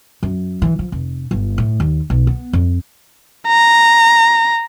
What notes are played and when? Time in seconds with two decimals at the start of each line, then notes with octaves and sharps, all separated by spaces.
0.23 F#2
0.62 E3
0.79 F3
0.92 F1
1.31 G1
1.58 A2
1.80 D#2
2.10 B1
2.27 B3
2.53 F2
3.48 A#5